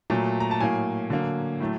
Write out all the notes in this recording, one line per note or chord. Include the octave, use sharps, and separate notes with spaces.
A#2 F#3 A3
A#5
A5
A2 F#3 A#3 G#5
D3 F#3 A#3
A2 F#3 A3